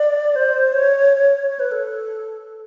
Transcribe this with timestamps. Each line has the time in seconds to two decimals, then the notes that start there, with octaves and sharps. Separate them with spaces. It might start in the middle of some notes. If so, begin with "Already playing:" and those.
Already playing: D5
0.36 C5
0.73 C#5
1.47 C#5
1.59 B4
1.72 A4